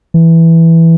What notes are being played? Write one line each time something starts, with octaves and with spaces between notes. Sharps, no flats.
E3